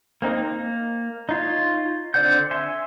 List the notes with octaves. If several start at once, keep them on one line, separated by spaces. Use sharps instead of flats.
A#3 C4 D#4
A#3
D#4 F4 C#5
D3 C4 D5 F#5 G6
E5 G#5 C6